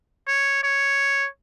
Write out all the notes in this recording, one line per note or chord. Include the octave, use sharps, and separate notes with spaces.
C#5
C#5